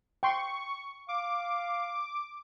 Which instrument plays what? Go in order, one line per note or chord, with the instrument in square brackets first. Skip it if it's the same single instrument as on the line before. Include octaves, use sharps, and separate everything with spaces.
[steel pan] G5 C6 [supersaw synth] C#6
[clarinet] F5 [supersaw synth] D6